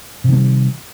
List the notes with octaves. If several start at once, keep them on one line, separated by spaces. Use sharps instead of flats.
C3 D#3 G3 A#3